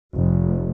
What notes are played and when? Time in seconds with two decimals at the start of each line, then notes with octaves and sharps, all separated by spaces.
0.16 F1